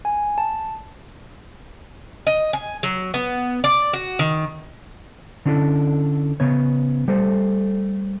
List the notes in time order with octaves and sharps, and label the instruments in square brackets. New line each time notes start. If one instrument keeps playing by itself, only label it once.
[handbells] G#5
A5
[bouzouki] D#5
G#5
F#3
B3
D5
F#4
D#3
[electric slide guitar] D3 C#4 D4 E4 A4
C#3 B3 C#5
G3 A3 A4 C5